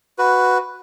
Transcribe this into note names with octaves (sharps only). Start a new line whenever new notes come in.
F#4 B4